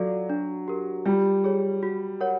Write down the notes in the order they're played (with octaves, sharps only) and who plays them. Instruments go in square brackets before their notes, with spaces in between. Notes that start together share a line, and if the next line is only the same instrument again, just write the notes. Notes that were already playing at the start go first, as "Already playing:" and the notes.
Already playing: [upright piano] F#3 [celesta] F4 A4 D5 F5
[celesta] D4
G4 A#4
[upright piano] G3 [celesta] F4
[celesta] G#4 C#5
F#4
A#4 C#5 F#5